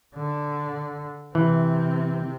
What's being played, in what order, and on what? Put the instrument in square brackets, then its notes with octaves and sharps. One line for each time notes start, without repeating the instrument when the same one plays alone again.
[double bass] D3
[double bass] C3 C4 [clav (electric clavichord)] E3